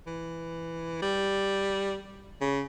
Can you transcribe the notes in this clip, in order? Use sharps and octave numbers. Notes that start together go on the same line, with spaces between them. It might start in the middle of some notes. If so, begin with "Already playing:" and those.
E3
G3
C#3